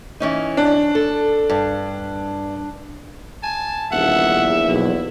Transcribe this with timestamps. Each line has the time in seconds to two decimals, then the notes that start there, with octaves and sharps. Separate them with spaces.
0.20 E3 C#4 D#4
0.57 D4
0.95 A4
1.49 G2
3.43 G#5 A5
3.92 D#1 A#1 E2 E5 F#5
4.68 B1 E4